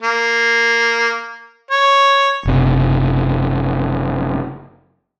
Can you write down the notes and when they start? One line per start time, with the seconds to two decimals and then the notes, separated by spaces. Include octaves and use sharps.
0.02 A#3
1.71 C#5
2.45 F#1 C3